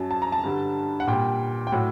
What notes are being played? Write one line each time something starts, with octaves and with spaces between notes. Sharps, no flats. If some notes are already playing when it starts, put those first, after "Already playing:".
Already playing: F#2 F#3 A5
A5
A#5
A5
G2 D3 G3
F#5
A#2 G3 G5
G5
A2 F#3 F#5